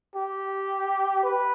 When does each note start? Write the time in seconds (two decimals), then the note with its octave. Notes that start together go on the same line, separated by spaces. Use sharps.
0.16 G4
1.24 B4